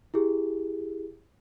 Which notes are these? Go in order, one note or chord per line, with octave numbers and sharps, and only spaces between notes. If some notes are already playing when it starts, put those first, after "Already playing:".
E4 G4 G#4